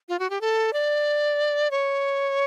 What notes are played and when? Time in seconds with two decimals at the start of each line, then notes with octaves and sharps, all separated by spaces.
0.09 F4
0.19 F#4
0.30 G4
0.41 A4
0.73 D5
1.71 C#5